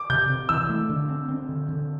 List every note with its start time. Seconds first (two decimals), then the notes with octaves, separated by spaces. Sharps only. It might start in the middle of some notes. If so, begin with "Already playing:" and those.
Already playing: D6
0.10 C3 G6
0.30 C3
0.49 E3 E6
0.69 A3
0.89 D3
1.09 C4
1.29 C4
1.49 D3
1.69 D3